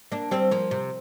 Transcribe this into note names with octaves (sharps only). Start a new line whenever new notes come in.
A#3 D4
G3 C4
F3 A#3
C3